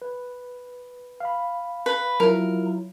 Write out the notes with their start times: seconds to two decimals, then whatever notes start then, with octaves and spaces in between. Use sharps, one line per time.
0.02 B4
1.20 F5 B5
1.86 B4
2.20 F#3 E4 F4 A#4